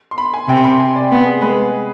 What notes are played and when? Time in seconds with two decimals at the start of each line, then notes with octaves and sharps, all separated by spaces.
0.11 C6
0.18 B5
0.34 G#5
0.48 C3 G5
0.57 C6
0.64 B5
0.80 G#5
0.96 D5
1.11 B3
1.26 G#4
1.41 G#3 B4